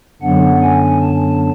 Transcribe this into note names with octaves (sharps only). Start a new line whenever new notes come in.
F#2 D3 F#3 B3 D4 F#5
G#5
A5